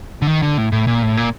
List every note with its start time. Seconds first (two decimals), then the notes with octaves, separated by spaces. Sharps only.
0.22 D3
0.27 D#3
0.42 D3
0.58 A2
0.72 A2
0.87 A#2
1.03 A2
1.17 A#2